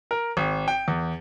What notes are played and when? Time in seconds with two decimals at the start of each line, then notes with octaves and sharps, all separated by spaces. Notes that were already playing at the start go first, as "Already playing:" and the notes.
0.11 A#4
0.37 G#1
0.68 G5
0.88 E2